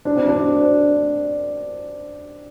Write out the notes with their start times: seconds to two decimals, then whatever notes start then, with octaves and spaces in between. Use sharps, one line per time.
0.05 D4
0.16 C4
0.27 D4